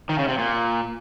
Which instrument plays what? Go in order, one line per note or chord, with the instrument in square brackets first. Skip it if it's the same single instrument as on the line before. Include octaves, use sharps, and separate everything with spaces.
[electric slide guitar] D#3
C#3
C3
A#2